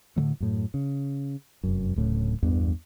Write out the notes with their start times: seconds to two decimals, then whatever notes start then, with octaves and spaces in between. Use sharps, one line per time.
0.16 A2 D3 F#3 A3
0.40 F#2 A2
0.74 C#3
1.63 F1 F#2
1.96 D1 A2 C#3
2.43 A1 E2 G2 B3